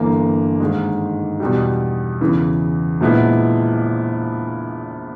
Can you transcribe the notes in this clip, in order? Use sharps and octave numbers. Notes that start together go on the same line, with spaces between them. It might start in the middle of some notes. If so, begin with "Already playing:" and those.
Already playing: G1 G2 E3 A#3
G#2 D#3 G#3
E2 B2 G3
E2 C#3 E3
A#1 A#2 G#3 B3 E4